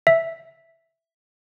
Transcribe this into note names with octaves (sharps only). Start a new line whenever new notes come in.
E5